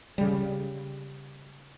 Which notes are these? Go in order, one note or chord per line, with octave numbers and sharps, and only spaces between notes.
C#3 G3